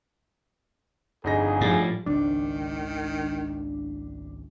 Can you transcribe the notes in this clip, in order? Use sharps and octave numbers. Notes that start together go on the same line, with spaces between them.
G1 F2 D#4 G#4 A#6
A2 F3 G3
G#1 C#2 D#3 G3 D4